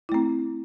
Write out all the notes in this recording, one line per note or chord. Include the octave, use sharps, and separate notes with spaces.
A3 C4 E4